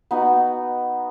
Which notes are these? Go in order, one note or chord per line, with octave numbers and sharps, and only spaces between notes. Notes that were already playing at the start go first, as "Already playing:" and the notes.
B3 D#4 F#4